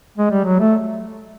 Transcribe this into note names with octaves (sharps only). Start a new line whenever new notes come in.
G#3
G3
F#3
A3